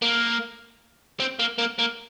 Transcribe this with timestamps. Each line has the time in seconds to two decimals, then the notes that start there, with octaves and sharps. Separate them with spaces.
0.02 A#3
1.20 C4
1.39 A#3
1.58 A#3
1.78 A#3